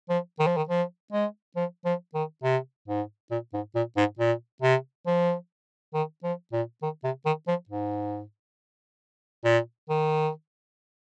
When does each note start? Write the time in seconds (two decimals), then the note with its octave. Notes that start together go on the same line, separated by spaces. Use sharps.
0.09 F3
0.39 D#3
0.47 F3
0.57 D#3
0.69 F3
1.12 G#3
1.56 F3
1.85 F3
2.14 D#3
2.44 C3
2.88 G#2
3.31 A#2
3.54 G#2
3.75 A#2
3.97 G#2
4.19 A#2
4.62 C3
5.07 F3
5.94 D#3
6.24 F3
6.52 A#2
6.82 D#3
7.04 C3
7.25 D#3
7.48 F3
7.69 G#2
9.44 A#2
9.89 D#3